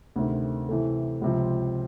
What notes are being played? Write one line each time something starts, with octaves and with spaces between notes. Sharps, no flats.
D2 C3 D#3
C3 E3 A3
C#2 C3 F3